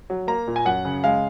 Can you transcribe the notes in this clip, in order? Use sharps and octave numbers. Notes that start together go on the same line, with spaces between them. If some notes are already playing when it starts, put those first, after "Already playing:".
F#3
A#3 A#5
A#2
G#5
F#2 F#5
C#3
G#3 F5